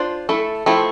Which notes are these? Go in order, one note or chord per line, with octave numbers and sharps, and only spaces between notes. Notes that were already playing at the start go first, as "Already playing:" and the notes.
Already playing: D4 F4 C5
A3 E4 A4
F3 A3 C4 E4